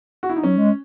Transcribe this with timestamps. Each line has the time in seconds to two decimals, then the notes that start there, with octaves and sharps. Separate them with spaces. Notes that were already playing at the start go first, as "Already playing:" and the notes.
0.23 F#4
0.29 E4
0.36 D#4
0.43 F#3 C#4
0.58 G#3